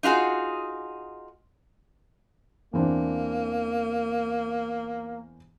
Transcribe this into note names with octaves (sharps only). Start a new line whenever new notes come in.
D#4 F4 F#4 G#4
E2 A#3 C4 D4